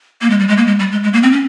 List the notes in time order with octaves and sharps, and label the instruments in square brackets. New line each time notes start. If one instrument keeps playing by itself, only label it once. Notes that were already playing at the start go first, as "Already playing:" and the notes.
[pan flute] A#3
G#3
G3
G#3
A#3
G#3
G3
G#3
G#3
A#3
C4
C#4